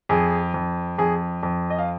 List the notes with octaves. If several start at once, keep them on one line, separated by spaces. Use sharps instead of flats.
F2 G#4
F2
F2 G#4
F2
D#5
F5